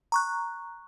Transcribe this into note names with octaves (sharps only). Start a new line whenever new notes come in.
A#5 C#6 F#6